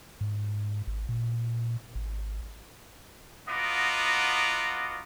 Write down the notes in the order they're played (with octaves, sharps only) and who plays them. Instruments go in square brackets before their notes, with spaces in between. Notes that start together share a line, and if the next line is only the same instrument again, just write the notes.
[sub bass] G#2
G#1
A#2
G#1
[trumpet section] B3 F4 F#4 D#5 A#5 D6